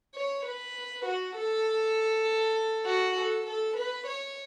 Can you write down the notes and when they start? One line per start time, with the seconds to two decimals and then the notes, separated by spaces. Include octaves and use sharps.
0.15 C#5
0.46 B4
1.05 F#4
1.36 A4
2.86 F#4
3.16 A4
3.46 A4
3.77 B4
4.07 C#5